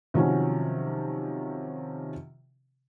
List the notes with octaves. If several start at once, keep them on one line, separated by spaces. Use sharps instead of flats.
C3 D#3 F3 F#3 C#4